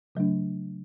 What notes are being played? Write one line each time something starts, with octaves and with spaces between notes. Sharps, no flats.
C#3 F#3 A3 D4